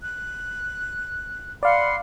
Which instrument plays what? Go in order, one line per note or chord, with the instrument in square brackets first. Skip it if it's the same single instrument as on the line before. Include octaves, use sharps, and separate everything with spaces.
[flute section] F#6
[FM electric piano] D5 F5 [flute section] F#5 B5 C6